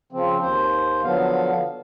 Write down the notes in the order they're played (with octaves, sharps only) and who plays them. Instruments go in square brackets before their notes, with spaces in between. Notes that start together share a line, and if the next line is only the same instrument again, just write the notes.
[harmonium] C#3 F3 C4
D#2 C5
D3 F3 F#3 B3 F5